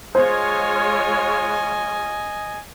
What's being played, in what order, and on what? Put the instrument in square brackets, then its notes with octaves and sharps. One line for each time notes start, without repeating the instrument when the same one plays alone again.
[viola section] G#3 F4 C#5 [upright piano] C5 [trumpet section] D#5 G#5